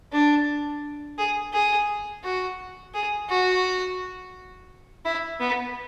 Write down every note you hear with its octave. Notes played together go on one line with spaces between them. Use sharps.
D4
G#4
G#4
F#4
G#4
F#4
E4
B3